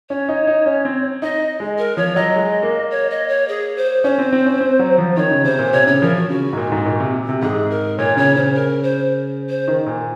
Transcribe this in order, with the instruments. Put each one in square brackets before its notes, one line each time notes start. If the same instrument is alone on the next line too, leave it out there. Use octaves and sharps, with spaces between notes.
[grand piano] C#4 [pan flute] C#5
[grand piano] D#4
D#4
C#4
C4
[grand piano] D#4 [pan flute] D#5
[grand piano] G#3
[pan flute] A#4
[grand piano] F3 [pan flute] C#5
[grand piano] F#3 [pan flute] D#5
[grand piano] G#3
A#3
[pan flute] C#5
D#5
C#5
G#4
C5
[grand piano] C#4 [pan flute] C5
[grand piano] C4
C4
C#4
C4
F#3
F3
[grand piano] D#3 [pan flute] C#5
[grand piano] C#3
[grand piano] C3 [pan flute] C5
[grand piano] A#2
[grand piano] C3 [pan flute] C#5
[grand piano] C#3 [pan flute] C#5
[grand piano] F3 [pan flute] A#4
[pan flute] F#4
[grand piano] C#3 [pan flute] F#4
[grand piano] G#2
A#2
G#2
A#2
C3
C3
[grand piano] G#2 [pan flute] G#4
[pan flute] A#4
[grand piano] A#2 [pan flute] C#5
[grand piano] C#3 [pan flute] C#5
[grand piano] C#3 [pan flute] C5
[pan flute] A#4
C5
C5
[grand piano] D#3
A#2